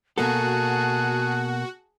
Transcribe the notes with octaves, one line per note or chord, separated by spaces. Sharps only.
B2 A#3 F#4 G#4 A4 A5 F#6